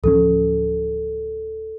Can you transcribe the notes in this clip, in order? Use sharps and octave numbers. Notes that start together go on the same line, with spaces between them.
D1 F3 C#4 A4